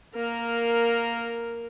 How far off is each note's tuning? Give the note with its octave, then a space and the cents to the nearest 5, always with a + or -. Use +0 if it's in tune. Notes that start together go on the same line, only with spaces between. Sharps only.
A#3 +0 A#4 -5